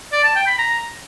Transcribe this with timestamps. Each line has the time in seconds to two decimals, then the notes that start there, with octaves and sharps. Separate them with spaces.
0.12 D5
0.24 A5
0.35 G5
0.47 B5
0.59 A#5